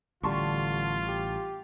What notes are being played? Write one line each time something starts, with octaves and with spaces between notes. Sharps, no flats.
A1 D3 G3 F4 A5 C6 C#6
G4